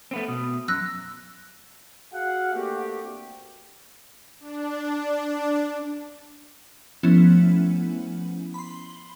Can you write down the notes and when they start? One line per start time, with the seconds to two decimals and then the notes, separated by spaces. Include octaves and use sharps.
0.11 A3 B3 C4
0.28 B2
0.68 F#2 E6 F#6 A#6
2.13 F#4 G#4 F5 F#5
2.54 A3 A#3 C4 D4 F#4 G4
4.40 D4
7.03 F3 A3 B3 C#4 E4
8.54 B5 C6